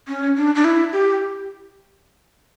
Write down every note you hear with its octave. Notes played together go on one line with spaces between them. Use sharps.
C#4
D4
D4
E4
G4